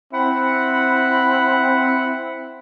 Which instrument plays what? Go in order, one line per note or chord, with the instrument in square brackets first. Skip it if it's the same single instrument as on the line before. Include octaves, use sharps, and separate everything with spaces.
[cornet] C4 [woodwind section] E4 F#5 B5